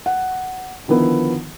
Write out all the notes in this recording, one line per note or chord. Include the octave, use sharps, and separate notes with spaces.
F#5
D3 D#3 F3 B3 E4